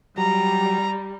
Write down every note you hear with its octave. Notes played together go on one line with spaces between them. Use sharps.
F#3 G3 G4 A#5